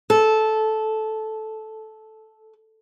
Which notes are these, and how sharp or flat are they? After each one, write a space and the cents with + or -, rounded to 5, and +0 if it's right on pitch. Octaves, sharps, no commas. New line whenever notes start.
A4 -10